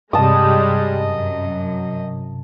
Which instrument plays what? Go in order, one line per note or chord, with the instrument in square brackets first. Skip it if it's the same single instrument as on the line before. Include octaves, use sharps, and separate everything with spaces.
[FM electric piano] G2 C3 [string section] G3 G#3 [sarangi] D#5 [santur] A5 D#6
[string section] F#2